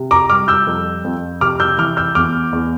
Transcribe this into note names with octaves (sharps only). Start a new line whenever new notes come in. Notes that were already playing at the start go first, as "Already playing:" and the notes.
Already playing: C3
A#5 D6
G3 D6 F6
E6 G6
F2
F2
C3 D6 F6
E6 G6
E3 D6 F6
E6 G6
E2 D6 F6
E2